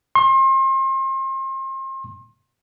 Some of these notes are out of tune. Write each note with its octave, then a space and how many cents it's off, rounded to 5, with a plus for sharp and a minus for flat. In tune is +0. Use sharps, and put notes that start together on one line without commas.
C6 +35